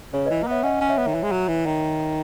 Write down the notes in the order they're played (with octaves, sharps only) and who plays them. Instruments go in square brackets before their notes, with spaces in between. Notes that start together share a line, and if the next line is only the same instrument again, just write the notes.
[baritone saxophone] C#3 [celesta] C#5
[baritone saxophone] E3 [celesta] B4 D#5
[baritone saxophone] A#3
[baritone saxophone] B3 [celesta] C#5 E5
[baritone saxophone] C#4 [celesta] D#5 F#5
[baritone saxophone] C#4
[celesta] C#5 E5
[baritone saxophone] B3
D#3
E3
G#3
F#3
E3
D#3